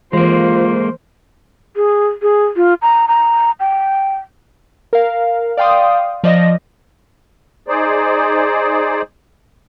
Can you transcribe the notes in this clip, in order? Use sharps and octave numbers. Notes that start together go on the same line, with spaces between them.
E3 G#3 A#3 F4 C5
G#4
G#4
F4
A#5
A#5
G5
A#4 F5
D5 F5 G5 C6 D#6
F3 D5 D#5 A#6
D#4 G#4 C5 D5